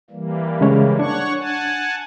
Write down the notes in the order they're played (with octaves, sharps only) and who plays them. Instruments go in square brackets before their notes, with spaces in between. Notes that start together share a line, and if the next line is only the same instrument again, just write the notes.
[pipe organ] E3 G3 A#3
[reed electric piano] C#3 G#3 C#5
[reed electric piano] D4 [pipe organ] C#5 F#5 C#6
[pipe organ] F#5 G#5 A5